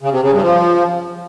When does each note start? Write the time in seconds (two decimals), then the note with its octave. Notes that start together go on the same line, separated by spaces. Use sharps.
0.02 C#3
0.12 C3
0.22 C#3
0.32 G2
0.42 F3